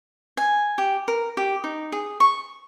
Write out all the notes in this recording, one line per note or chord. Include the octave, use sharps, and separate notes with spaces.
G#5
G4
A#4
G4
D#4
G#4
C#6